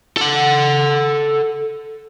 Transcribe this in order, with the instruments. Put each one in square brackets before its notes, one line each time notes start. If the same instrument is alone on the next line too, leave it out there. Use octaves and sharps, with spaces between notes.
[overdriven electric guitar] A4 F#5